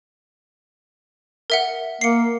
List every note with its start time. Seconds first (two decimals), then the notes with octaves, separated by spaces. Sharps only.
1.50 A#4 E5 F#5
2.01 A#3 C7 C#7